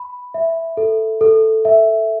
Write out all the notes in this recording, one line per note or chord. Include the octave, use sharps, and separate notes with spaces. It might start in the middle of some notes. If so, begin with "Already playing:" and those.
Already playing: B5
E5
A4
A4
E5